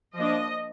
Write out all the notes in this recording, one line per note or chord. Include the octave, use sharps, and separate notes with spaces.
F3 A#3 D4 D#5